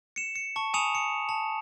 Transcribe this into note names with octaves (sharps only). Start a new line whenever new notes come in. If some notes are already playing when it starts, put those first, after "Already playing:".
C#7 E7
C#7
A5 C#6
G#5 B5 D#6 C#7 E7 F7
C#7
A5